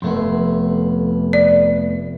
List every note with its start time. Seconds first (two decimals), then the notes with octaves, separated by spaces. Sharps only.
0.02 F1 F2 A3 B3 C6
1.33 D5